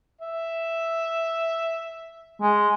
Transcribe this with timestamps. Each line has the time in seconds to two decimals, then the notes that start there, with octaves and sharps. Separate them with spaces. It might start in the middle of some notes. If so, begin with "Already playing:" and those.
0.21 E5
2.42 G#3